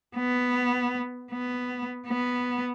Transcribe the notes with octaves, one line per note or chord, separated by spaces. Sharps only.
B3
B3
B3